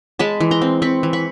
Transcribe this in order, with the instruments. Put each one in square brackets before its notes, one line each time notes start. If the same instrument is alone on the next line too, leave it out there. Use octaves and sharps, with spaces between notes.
[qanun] G#3 A5 B5
E3
A#5 C6
C4
C4 B5 C#6
E3
B5 C#6